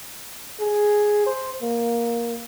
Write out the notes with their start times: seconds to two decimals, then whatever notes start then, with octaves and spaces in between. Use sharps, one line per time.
0.60 G#4
1.27 C5
1.62 A#3